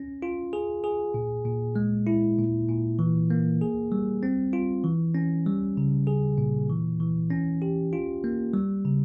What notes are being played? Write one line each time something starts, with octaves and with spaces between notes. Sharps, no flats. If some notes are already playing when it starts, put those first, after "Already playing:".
Already playing: C#4
F4
G#4
G#4
A#2
A#2
G#3
E4
A#2
A#2
E3
A#3
G#4
G3
C4
F4
E3
C#4
G3
C#3
G#4
A#2
E3
E3
C#4
G4
F4
A#3
G3
C#3